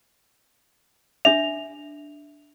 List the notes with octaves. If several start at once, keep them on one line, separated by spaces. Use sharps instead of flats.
D4 E5 F7